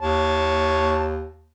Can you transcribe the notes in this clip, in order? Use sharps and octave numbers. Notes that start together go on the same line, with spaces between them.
D#2 C#5 A5